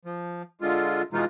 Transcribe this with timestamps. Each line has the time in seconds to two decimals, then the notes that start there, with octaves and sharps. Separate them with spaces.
0.05 F3
0.61 D3 G#3 F4
1.13 B2 E3 G#3 D#4 F4